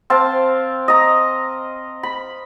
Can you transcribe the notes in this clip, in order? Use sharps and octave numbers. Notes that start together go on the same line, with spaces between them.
C4 F5 A5
D#5 A#5
B5